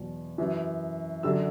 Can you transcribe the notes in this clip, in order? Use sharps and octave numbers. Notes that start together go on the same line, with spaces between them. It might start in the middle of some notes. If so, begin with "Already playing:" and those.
Already playing: E2 B2 F#3
F#2 E3
F#2 D3 F#3 E6